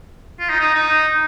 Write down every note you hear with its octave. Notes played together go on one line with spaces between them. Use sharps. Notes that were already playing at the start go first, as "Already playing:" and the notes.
F4
D#4
D#4
D#4